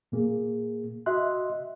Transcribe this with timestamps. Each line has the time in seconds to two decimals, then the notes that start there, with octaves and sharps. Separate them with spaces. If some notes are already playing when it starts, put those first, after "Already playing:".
0.12 A#2 A#3 G#4
1.06 F#4 D#5 E5 C6 F#6